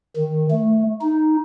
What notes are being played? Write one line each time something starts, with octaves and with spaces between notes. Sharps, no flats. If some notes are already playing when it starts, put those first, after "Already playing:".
D#3
A3
D#4